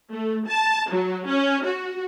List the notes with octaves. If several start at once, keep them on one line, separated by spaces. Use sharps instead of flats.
A3
A5
F#3
C#4
F#4